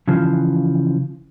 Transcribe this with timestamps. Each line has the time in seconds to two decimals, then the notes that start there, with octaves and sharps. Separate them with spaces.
0.08 C#3 E3 F3